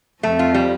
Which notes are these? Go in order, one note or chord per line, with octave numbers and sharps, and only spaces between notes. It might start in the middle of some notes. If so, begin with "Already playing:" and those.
F2 F3 A3
F4
G3